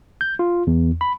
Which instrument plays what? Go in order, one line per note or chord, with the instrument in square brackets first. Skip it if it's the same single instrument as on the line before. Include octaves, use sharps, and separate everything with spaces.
[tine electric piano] G6
F4
E2
B5